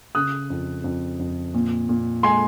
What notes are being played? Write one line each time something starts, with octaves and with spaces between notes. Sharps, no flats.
C#3 D#6 F#6
F2
F2
F2
A#2
A#2
G#3 G#5 C6